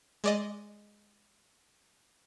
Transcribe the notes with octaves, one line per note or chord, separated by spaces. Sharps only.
G#3 D5 D#5